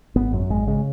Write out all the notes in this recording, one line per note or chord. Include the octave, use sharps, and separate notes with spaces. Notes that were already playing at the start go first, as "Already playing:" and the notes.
G#1 B3
F#2 F#3
G#1 G#3
C#3 G#3